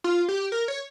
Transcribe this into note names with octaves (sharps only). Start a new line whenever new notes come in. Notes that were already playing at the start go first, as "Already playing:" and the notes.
F4
G4
A#4
C#5